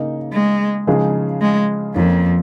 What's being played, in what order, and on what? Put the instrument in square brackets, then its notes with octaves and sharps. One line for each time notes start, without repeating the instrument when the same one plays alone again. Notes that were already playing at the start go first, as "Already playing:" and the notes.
Already playing: [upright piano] C#3 A#3 D#4 G#4
[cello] G#3
[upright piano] C#3 F3 G#3 D#4 G#4
[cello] G#3
[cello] F2 [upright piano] F3 A#3 C#4